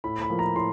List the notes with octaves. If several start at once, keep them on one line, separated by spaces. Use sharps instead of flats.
A2 B5
B5
F3 A#3
A#5
A2 C6